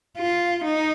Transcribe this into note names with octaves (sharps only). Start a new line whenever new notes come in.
F4
D#4